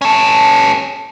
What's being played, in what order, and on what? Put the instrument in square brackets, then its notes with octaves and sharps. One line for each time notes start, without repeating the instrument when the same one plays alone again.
[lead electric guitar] C#4 A4